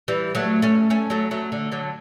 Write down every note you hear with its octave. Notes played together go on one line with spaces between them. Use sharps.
E3 G3
F#3 A3
A3 C#4
A3 C#4
F#3 A3
F#3 A3
D3
D3 F#3